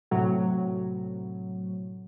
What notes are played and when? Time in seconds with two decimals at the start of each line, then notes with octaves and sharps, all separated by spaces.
0.11 A2 C3 F#3